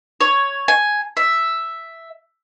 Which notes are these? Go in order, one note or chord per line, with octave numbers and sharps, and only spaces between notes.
C#5
G#5
E5